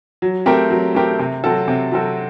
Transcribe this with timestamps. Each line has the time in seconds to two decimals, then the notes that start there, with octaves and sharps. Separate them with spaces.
0.22 F#3
0.46 A3 C4 G4 A#4
0.70 F#3
0.95 A3 C4 G4 A#4
1.19 C3
1.44 F#3 C4 F#4 A4
1.68 C3
1.92 F#3 C4 F#4 A4